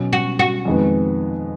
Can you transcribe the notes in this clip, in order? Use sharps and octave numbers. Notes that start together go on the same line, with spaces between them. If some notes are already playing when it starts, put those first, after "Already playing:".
Already playing: B2 F#3 C#4
F#4
F#4
F2 D#3 G#3 B3